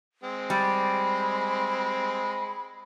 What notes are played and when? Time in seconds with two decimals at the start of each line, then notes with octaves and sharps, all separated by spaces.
0.23 G#3 C4
0.50 G3 B5